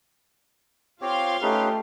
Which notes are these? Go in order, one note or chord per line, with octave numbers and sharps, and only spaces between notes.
C4 F4 G4 C#5 F5 C6
A3 C#4 D#4 G4 B4